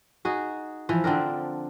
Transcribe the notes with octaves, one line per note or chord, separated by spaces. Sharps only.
D#4 F#4 G#4
E3 F3
D3 C4 D4 A#4